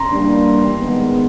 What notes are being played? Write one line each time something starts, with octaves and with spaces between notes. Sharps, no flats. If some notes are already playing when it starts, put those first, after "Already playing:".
Already playing: A#5 C6
E3 G3 A#3 D4
D#3 G#3 B3